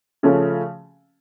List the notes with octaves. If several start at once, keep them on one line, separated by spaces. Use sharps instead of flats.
C#3 F3 A3 C#4